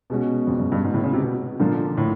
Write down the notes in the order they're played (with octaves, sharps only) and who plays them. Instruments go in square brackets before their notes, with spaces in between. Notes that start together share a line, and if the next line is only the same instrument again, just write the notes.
[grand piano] B2 G#3 C#4 F#4
[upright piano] F2
F#2
G2
G#2
A2
C#3
C3
B2
[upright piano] A#2 [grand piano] D3 F3 A#3
[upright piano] A2